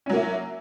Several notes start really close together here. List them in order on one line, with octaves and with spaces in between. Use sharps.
C#4 F#3 A#3 E4